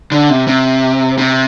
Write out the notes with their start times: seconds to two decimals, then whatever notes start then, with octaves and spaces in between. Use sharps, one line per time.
0.12 D3
0.30 C3
0.47 C3
1.18 C3